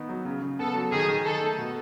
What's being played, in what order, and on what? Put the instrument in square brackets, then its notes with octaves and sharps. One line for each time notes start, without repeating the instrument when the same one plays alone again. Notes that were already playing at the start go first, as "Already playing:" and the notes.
Already playing: [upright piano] D#3 B3 D#4
F#3
C#3
C#3
[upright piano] B3 [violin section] A4
[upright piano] F#3
[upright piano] D#3 [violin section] G#4
[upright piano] D#3
[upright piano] D#4 [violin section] A4
[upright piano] A3
B2